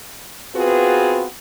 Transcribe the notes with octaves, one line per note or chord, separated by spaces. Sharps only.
B3 C4 F4 F#4 G#4 B4